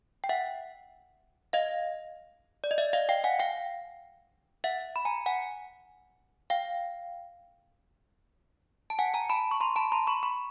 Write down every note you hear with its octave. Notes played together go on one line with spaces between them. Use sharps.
G5
E5 F#5
D#5 F5
D5
D#5
D5 E5
D#5 F5
F5 G5
F#5 G#5
F5 G5
E5 F#5
B5
G#5 A#5
F#5 G#5
F5 G5
A5
F#5 G#5
G#5 A#5
A5 B5
C#6
A#5 C6
A5 B5
A#5 C6
B5 C#6
B5 C#6